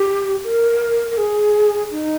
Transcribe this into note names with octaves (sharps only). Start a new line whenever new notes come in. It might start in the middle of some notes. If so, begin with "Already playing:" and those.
Already playing: G4
A#4
A#4
G#4
D#4